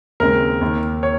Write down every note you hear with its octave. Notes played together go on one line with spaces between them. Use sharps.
D#2 C#3 G#3 C4 A#4
D#2 D#3 A#3
C#5